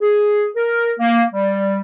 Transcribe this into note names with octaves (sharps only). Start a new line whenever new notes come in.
G#4
A#4
A#3
G3